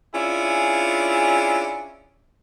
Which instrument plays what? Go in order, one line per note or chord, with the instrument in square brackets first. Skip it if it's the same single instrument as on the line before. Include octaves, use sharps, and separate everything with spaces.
[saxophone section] C#4 D4 E4 F4 G#4